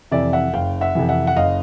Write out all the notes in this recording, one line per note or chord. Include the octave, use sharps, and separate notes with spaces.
F2 C3 E3 D5 E5
E5 F#5
F#1 F5 G5
E5 F#5
F2 C3 E3
E5 F#5
F#5
F#1 D#5 F5